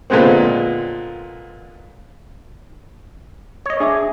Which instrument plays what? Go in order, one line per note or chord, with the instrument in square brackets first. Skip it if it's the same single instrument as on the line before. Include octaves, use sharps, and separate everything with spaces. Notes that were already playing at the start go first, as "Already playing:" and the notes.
[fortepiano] A#2 D3 G#3 B3 C4
[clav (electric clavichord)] C#5 D#5
[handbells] D4 E5 D6 [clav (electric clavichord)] G#4